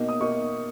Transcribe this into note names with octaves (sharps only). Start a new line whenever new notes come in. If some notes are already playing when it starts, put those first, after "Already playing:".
Already playing: B2 A#3 D#4
D#6
B2 A#3 D#4 C#6